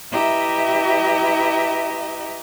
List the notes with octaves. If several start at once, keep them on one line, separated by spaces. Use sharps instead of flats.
E4 G4 B4 D#5 E5 A#5